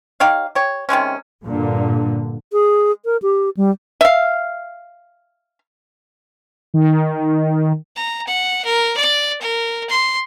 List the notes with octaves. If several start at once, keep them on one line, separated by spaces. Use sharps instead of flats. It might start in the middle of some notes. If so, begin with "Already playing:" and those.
D#4 G4 C#5 F5
G4 C#5
C3 D#3 G#3 C#4
G2 A#2 D3
G#4
A#4
G4
G3
E5 F5
D#3
A#5
F#5
A#4
D5
A#4
C6